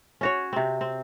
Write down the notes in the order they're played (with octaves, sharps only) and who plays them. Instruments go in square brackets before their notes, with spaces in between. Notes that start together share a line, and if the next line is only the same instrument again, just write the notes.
[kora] C#4 F#4 C#5
C3 C4
C4